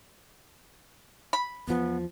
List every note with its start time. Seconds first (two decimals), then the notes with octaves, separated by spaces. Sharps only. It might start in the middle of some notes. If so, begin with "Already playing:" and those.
1.33 B5
1.67 E2 F3 B3